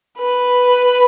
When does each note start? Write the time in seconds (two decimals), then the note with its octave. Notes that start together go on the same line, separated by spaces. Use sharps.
0.18 B4